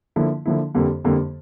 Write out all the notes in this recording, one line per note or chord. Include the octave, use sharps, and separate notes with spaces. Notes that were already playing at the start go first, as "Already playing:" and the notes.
D3 F3 A#3 E4
D3 F3 A#3 E4
F2 D3 G3 A#3
F2 D3 G3 A#3